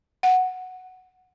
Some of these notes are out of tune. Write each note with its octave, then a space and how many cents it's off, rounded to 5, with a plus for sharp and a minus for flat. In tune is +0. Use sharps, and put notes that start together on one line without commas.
F#5 +0